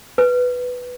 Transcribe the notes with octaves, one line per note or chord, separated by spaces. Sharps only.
B4